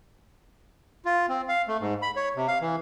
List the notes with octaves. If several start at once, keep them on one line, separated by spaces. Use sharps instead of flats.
F4
C4
F5
A3
G#2
B5
C#5
C3
F5
E3